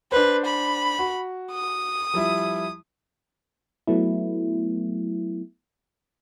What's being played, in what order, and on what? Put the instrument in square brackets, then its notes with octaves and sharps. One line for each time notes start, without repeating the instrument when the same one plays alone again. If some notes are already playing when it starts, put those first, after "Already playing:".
[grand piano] D4 C5 [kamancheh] B4
[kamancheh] B5
[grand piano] F#4
[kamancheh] D#6
[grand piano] F3 G3 E4
[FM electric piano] F#3 A3 B3 E4